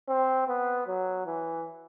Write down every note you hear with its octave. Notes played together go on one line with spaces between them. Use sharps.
C4
B3
F#3
E3